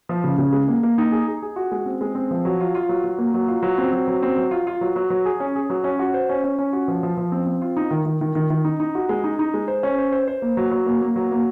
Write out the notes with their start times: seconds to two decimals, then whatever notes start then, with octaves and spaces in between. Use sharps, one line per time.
0.09 F3
0.24 C#3
0.38 C#3
0.53 G#3
0.68 A#3
0.83 A#3
0.98 D#4
1.12 G#4
1.28 G#4
1.42 G#4
1.56 F#4
1.71 G#3
1.86 C4
2.01 G#3
2.15 C4
2.31 F3
2.45 F#3
2.60 F4
2.75 F4
2.89 F#3
3.04 F#3
3.18 A#3
3.34 F#3
3.48 F4
3.63 F#3
3.78 C4
3.93 F#3
4.08 F#3
4.23 C4
4.38 F#3
4.51 F4
4.67 F4
4.81 F#3
4.96 F#3
5.10 F#3
5.25 G#4
5.40 C#4
5.55 G#4
5.70 F#3
5.84 C#4
5.99 F#4
6.14 C5
6.29 C#4
6.44 C#4
6.59 C#4
6.73 F#4
6.88 F3
7.03 F3
7.17 F3
7.32 C4
7.46 C4
7.62 F4
7.77 D#4
7.91 D#3
8.06 D#3
8.21 D#3
8.35 D#3
8.50 D#3
8.64 D#4
8.80 D#4
8.95 F#4
9.09 G#3
9.24 D#4
9.39 D#4
9.54 G#3
9.68 C5
9.83 C#4
9.98 C5
10.12 C5
10.28 C5
10.42 A#3
10.57 F#3
10.71 F#3
10.86 A#3
11.02 A#3
11.16 F#3
11.31 A#3